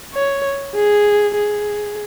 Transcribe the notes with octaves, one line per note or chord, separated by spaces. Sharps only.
C#5
G#4
G#4